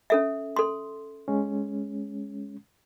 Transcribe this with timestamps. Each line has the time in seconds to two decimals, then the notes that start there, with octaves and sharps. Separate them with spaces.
0.10 C#4 A4 E5
0.56 A4 C6
1.28 G#3 C#4